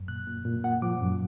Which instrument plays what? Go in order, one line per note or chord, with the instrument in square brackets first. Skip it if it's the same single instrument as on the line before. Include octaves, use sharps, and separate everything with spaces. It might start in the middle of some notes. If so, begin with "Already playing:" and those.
Already playing: [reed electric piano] F#2
A#2 F#6
A#2
A#2
A#2 F#5
F3 D6
F#2